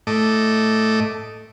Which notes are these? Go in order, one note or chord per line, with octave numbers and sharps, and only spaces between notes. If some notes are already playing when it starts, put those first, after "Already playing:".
A2 A3 D#5 D6